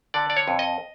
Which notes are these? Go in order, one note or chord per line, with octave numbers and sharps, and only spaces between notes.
D3 D5
D5
C#5
F2
D#5